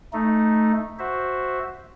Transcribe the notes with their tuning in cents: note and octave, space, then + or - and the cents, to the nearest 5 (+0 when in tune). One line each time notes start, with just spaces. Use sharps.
A3 +0 D#4 +0
F#4 +0 C5 +0 E5 +0